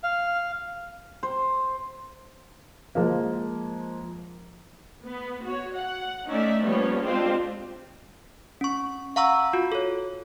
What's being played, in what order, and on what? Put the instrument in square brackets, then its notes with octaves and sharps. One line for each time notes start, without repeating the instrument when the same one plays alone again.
[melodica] F5
[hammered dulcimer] C5
[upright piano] F3 G#3 A#3
[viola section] B3
F#4 C#5
F#5
A3 C#4 D#4 D5 E5
F3 G3 A#3 B3 C#4 C#5
G#3 C4 D4 F4 G4 C5
[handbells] C#4 C#6
F5 F#5 A#5 C#6 E6
F4 F#4
A4 C#5